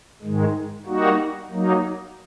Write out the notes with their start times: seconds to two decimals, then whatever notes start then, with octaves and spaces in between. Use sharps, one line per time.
0.22 G#2 D#3 G#3
0.86 G3 A#3 D#4 F#4
1.51 F#3 A#3 D#4